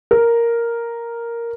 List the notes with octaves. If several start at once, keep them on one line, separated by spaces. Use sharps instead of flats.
A#4